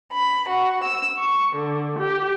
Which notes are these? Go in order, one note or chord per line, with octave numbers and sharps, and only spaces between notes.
B5
F#4
E6
C#6
D3
G4